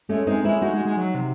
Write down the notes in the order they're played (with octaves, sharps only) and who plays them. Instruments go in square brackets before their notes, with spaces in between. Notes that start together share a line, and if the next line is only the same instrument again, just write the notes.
[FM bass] G#3 [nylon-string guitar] A3 C#4
[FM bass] G#3 [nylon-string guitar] C4 D#4
[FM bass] G#3 [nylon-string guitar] C#4 E4
[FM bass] G#3 [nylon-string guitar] D#4 F#4
[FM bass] G#3
G#3
F#3
C3